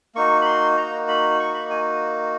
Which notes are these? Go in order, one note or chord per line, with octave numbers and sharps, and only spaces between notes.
A#3 D#4 F#4 C#6
B5
C6
A#5
B5
C#6
B5
G#5